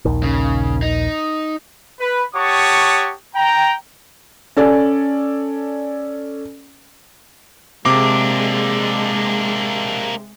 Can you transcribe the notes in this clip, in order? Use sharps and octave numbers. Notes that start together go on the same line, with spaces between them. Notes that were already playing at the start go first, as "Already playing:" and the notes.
A#1 D#2 D#3
C#3
D#4
B4
G4 C#5 F#5 A5 C#6 D#6
G5 A#5
C#4 A4 D5 G#5
C3 G#3 A#3 D4 D6